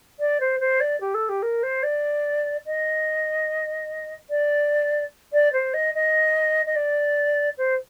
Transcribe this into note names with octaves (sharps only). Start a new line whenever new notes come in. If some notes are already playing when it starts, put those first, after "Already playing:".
D5
C5
C5
D5
G4
A4
G4
A#4
C5
D5
D#5
D5
D5
C5
D#5
D#5
D#5
D5
C5